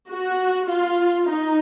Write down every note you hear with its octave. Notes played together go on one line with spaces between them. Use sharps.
F#4
F4
D#4